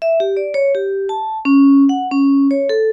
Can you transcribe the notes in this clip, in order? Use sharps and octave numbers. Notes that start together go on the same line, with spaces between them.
E5
G4
D5
C#5
G4
A5
C#4
F#5
C#4
C#5
A4